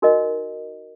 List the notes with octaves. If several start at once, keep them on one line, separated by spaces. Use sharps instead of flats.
D#4 F#4 A#4 D#5